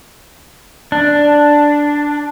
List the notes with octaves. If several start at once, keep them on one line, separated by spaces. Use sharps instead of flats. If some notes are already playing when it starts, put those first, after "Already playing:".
D4